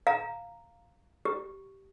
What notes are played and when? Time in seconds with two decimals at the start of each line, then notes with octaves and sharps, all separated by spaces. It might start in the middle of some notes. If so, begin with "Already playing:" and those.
0.07 F5 A#5
1.25 G4